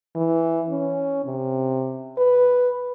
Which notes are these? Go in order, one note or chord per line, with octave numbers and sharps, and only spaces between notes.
E3
C#4
C3
B4